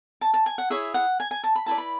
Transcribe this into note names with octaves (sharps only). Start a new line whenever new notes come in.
A5
A5
G#5
F#5
E4 G#4 C#5 E5
F#5
G#5
G#5
A5
B5
E4 B4 D5 A5
B5